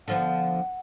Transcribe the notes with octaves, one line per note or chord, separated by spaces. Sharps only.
D3 F3 B3 F#5